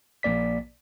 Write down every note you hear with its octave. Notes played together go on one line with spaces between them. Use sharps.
A#1 A#3 D5 B6